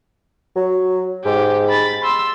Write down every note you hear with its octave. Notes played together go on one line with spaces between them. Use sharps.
F#3
G#2 G4
B5 A6
C6 E6